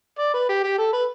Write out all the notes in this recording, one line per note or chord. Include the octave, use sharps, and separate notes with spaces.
D5
B4
G4
G4
A4
B4